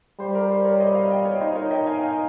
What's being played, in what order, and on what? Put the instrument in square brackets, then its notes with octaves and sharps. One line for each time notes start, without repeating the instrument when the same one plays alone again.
[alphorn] G3 [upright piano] C5
[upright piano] A#4
C5
A#4 C#5
C5 D#5
C#5 F5
D#5 G5
C#5 F5
[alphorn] D#4 [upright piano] C5 D#5
[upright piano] A#4 C#5
D#5 G5
F5 G#5
F5 G#5